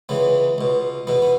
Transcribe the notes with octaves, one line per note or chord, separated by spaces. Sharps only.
C#2 C#3 E3 B3
C#2 B2
E2 B2 B3
B3